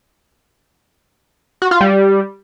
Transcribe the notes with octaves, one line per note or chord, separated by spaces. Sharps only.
F#4
F4
G3